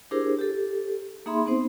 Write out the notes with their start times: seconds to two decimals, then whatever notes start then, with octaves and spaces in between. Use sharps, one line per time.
0.11 D4 E4 G4 G#4 A#4 C5
0.39 G4 A4
1.26 A#3 D#4 G#4 E5 B5 C6
1.46 B3 C4 D#4 C5